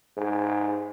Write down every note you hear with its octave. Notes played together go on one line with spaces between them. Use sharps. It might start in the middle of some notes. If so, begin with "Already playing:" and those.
G#2